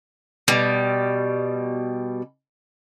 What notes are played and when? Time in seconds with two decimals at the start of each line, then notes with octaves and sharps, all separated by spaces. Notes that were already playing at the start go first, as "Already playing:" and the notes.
0.48 B2 G3